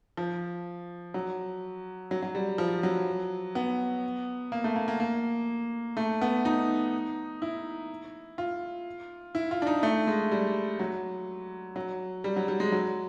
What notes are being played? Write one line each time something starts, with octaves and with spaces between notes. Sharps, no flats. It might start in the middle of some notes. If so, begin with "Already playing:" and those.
F3
F#3
F#3
F#3
G3
F3
F#3
B3
A#3
A3
A#3
A#3
A#3
A3
B3
D#4
E4
F4
E4
F4
D4
D#4
A3
G#3
G3
F#3
F#3
G3
F#3
G3
G#3
F#3